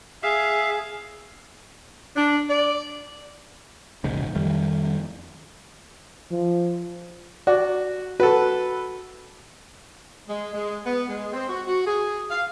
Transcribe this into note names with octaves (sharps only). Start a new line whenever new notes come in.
G#4 E5 F5
D4
D5
E1 A#1 G#2 C#3
F2 D#3 G3 A3
F3
F#4 D5
F#4 A4 B4
G#3
G#3
B3
G#3
C4
F#4
F#4
G#4
F5